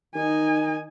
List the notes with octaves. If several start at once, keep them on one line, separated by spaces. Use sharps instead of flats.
D#3 D#4 G#5